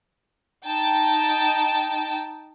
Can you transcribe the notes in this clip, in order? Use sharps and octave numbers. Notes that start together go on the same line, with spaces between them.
D#4 G5 A5